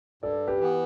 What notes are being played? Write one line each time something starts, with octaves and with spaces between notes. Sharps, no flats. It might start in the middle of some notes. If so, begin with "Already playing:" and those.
G2 A4 D5
G4 B4
E3 B3